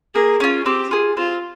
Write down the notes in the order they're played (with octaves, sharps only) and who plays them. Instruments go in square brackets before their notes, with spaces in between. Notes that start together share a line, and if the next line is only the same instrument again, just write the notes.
[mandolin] A#3 [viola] G#4
[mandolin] C#4 F4
[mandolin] C4 [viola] G4
[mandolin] F4 G#4
[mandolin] C4 [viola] F4